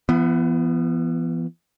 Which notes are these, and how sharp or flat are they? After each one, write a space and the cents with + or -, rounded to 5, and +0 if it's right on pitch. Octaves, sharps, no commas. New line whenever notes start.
E3 +45 B3 +0